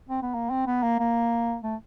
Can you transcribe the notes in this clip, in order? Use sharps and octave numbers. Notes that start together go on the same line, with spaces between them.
C4
B3
A#3
C4
B3
A#3
A#3
A3